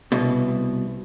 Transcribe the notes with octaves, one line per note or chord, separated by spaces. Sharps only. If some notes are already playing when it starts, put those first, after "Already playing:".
C2 B2